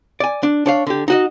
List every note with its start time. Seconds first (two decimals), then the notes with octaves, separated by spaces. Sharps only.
0.20 D5 G#5
0.43 D4
0.66 D4 C#5 F5
0.87 D3 G4
1.08 D#4 F#4 D#5